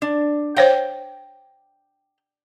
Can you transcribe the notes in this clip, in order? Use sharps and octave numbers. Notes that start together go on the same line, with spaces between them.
D4
C5 C#5 F5 G5